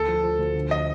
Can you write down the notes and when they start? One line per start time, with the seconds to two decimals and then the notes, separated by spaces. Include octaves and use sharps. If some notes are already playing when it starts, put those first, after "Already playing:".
Already playing: D2 A4
0.08 F3
0.24 F3
0.39 D2
0.56 D3
0.71 D#5